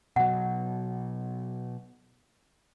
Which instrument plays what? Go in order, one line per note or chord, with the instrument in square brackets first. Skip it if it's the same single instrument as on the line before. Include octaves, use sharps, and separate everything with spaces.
[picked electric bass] B2 F#3 [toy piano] F#5